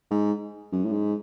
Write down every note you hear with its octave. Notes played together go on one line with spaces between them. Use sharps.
G#2
F#2
A2
G#2